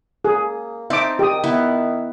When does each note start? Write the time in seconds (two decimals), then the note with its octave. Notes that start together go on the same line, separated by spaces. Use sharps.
0.25 A#3 G#4
0.90 C4 D#4 E5 A5 D6
1.19 D#3 G4 D#6
1.44 B3 E4